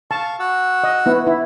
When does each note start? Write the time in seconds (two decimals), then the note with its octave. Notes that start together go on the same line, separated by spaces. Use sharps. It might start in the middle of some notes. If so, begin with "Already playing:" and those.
0.11 F5 A5 C#6
0.40 F#4 F#5 E6
0.84 D#5
1.06 B3 E4
1.27 E4